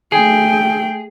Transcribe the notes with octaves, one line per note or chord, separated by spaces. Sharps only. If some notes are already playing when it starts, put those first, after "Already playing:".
A3 G#4 G5